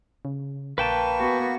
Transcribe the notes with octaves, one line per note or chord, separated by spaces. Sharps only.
C#3
A#1 A#3 B4 G5 A5 C#6
B3 F#4